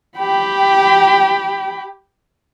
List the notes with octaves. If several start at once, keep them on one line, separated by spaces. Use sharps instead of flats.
G4 G5 B5